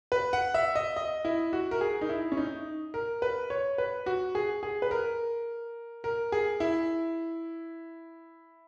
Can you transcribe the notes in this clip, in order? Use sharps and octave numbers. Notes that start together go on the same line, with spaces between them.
B4
F#5
E5
D#5
D#5
E4
F#4
A#4
G#4
D#4
E4
C#4
D#4
A#4
B4
C#5
B4
F#4
G#4
G#4
B4
A#4
A#4
G#4
E4